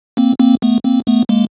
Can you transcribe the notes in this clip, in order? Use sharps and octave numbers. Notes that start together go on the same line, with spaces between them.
A#3 C4
A#3 C4
A3 B3
A#3 C4
A3 B3
G#3 A#3